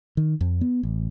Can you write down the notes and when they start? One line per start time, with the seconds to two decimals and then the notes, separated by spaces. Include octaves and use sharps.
0.17 D#3
0.41 F2
0.61 B3
0.83 A1